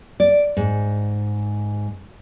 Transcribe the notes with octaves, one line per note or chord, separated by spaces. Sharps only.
D5
G#2